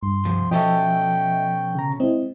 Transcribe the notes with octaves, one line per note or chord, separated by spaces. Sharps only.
G2 C6
C#2 C3 F3
B2 F3 C#4 A4 D#5 E5 G5
C#3 A#5
G#3 C4 E4 D#5